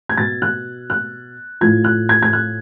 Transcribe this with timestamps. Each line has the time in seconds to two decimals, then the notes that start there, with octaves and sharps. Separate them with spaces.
0.09 G#6
0.17 B2 A6
0.42 F#6
0.90 F#6
1.61 A2 F3 G#6
1.84 F#6
2.09 G#6
2.22 G#6
2.33 F#6